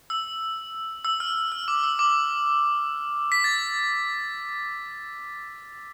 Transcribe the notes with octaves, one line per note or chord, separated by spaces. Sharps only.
E6
E6
F6
F6
D6
E6
D6
B6
A6